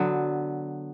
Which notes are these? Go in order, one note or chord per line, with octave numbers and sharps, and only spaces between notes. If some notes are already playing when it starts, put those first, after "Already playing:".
Already playing: D3 F#3 B3